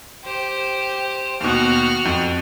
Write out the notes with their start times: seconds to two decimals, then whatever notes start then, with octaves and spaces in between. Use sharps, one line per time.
0.24 G4 C5
1.40 D#2 B2 F#4 F6
2.05 F2